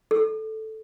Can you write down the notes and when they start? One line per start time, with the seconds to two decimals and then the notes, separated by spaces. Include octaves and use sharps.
0.11 A4